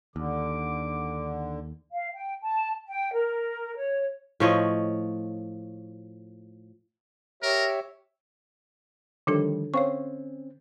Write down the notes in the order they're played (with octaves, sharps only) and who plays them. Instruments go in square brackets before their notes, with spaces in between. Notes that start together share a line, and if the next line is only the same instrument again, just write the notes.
[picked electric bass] D#2 [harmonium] D3 [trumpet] D6
[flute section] F5
G5
A5
G5
A#4
C#5
[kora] A2 F3 C#5 D#5
[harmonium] G4 C#5 E5 [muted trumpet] A#4
[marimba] D3 D4 A4 [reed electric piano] D#3 F3 G3
[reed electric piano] C4 C#4 [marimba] C#5 F5 C#6